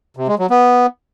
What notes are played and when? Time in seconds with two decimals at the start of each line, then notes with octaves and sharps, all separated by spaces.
0.17 C3
0.28 G#3
0.39 F#3
0.50 B3